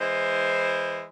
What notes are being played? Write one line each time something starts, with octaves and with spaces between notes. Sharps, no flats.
E3 G#3 E4 C5